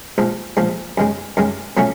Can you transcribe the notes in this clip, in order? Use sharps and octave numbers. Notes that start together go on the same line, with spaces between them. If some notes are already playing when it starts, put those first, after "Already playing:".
A#1 G#2 F3
A#1 G#2 F3
F#2 D#3 G#3
F#2 D#3 G#3
A#2 F#3 A3 C#4